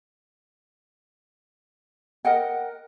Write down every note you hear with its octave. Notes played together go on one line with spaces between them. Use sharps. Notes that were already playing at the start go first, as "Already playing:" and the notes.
A#4 D#5 F#5 G5